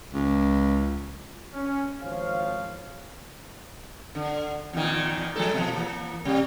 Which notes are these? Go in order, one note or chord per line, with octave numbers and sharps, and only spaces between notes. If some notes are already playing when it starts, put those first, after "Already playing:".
C#2
C#4
G#1 F3 C#5 F5
D3
E2 A#2 D#3
F3 G#3 A4
B2 F3
E3 A#3
C3 G3